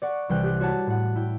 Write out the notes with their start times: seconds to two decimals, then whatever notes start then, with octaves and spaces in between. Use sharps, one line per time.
0.02 D5 F#5 C#6
0.29 C2 E3 G5 F#6
0.44 G4 F#6
0.60 F#4 C#5 F#5 A5
0.87 A2 F#5
1.15 E4 G5